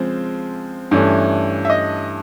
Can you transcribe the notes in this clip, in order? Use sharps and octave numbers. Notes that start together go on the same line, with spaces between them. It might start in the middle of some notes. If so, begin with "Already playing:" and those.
Already playing: C#3 F3 G#3 C4
G2 E3 A3 C#4
E5
D#5